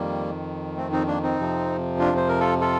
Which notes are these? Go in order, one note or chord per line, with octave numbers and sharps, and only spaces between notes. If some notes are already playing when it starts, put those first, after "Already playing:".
Already playing: F2 D#3 G3 A#3
A3 C4
C4 D#4
A#3 D4
C4 D#4
F2 C3 F3
D4 F4
C5
A#4
F4 A4
F4 A4